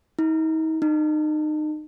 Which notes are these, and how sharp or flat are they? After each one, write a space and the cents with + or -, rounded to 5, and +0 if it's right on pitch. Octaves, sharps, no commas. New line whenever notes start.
D#4 +40
D#4 -30